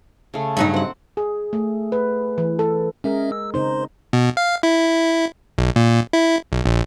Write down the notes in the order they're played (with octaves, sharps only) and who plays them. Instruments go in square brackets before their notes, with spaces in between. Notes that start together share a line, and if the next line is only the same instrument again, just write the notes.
[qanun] C#3 A3
[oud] G2 F#3 D#4
[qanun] C4 F#5
[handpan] G#4
A3
B4
E3
A4
[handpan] G#3 G#4 A#4 [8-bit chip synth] C#4 E5
[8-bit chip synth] E6
[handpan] C#3 C4 D#4 [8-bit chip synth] C5 C6
[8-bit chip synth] B2
F5
E4
B1
A#2
E4
B1
A#1